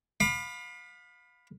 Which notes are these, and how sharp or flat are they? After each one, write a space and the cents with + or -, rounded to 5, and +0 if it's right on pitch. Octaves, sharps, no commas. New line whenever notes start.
F5 +35 B5 +0 D6 +40